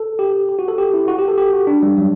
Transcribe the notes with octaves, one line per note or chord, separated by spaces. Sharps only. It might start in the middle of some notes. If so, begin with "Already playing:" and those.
Already playing: A4
G4
G4
F#4
A4
G4
E4
F#4
G4
A4
G4
F#4
D4
G3
F#3